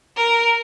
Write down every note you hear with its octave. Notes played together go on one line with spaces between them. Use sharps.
A#4